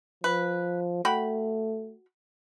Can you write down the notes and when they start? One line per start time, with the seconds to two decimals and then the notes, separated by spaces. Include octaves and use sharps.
0.24 F3 B4
1.05 A3 F#4 G5 B5